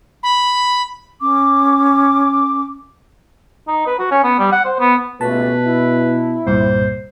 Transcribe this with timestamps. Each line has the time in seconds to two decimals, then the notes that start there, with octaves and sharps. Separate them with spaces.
0.23 B5
1.21 C#4 D6
3.68 D#4
3.87 B4
3.99 F#4
4.11 C#4
4.24 B3
4.39 G3
4.52 F#5
4.65 C5
4.79 B3
5.21 C#2 B2 A3 B4 A5
5.66 E4
6.47 C2 G2 A#2 C5